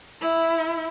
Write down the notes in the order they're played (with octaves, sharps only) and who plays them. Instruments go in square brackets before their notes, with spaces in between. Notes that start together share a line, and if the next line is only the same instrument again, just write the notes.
[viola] E4